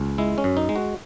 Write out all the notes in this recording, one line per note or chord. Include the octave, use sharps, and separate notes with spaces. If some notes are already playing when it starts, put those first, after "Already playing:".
Already playing: C#2
G#3 E4
C#4
F#2
D#4
G#3
F#4